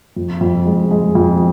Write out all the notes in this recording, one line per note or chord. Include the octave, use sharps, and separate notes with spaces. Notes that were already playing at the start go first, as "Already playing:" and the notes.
F2
F2
G#3
G#3
F2